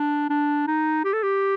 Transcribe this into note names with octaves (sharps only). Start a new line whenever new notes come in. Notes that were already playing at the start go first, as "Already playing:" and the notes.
Already playing: D4
D4
D#4
G4
A4
G4